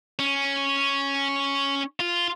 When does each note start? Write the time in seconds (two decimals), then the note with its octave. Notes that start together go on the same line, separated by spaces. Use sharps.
0.19 C#4
2.00 F4